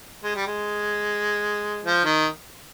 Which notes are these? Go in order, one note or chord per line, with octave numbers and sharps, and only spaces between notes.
G#3
G3
G#3
F3
D#3